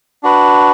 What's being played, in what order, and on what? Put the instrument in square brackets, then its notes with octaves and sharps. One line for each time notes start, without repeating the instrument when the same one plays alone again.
[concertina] D4 F#4 B4